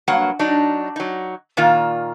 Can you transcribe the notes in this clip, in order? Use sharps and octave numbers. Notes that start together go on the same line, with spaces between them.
G2 F#3 A#3 F#5
F#3 D4 D#4
F#3 D#4
A#2 D#3 A#3 F4